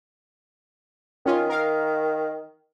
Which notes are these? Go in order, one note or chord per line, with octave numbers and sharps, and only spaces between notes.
D#3 C#4 F4
A#4 F5